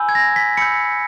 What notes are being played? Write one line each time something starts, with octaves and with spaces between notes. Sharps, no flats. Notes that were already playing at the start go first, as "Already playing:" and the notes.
Already playing: G#5 B5 E6 G6
G#6
A#6
B6
B5 E6 G6 C#7